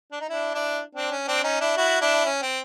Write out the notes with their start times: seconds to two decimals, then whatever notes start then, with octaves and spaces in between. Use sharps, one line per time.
0.12 D4
0.21 D#4
0.30 D4 E4
0.54 D4 E4
0.95 C4 D4
1.11 C#4
1.28 C4 D4
1.44 C#4 D#4
1.60 D4 E4
1.77 E4 F#4
2.01 D4 E4
2.26 C#4
2.42 C4